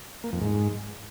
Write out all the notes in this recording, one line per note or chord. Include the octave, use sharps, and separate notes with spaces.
A#3
F2
G#2